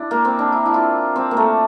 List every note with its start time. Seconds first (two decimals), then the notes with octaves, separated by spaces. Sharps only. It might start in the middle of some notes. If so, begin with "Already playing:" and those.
Already playing: D4 E4
0.11 A#3
0.25 C4
0.39 D4
0.52 E4
0.66 E4
0.74 F4
1.16 C4
1.31 A#3
1.37 A3